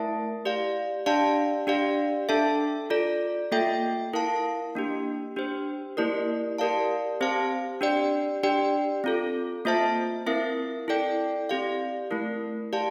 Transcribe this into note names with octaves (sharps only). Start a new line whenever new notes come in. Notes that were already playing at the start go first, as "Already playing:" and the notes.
Already playing: A3 E4 A#4 E5 A5
G4 D5 F5
D4 G4 D5 F5 A5
D4 G4 D5 F5
D4 A4 E5 A5
F4 A4 D5
A#3 F4 A4 E5 G5
E4 A#4 F5 A5
A#3 D4 G4
D4 G4 C5
A#3 E4 G4 A#4 D5
G4 A#4 D5 F5 A5
C4 G4 C5 F5 A5
D4 G4 D5 G5
D4 G4 D5 G5
C4 F4 A4
A#3 F4 C5 E5 A5
C4 E4 A#4 E5
E4 A4 D5 G5
C4 G4 D5 F5
A3 E4 A#4
G4 D5 F5 A5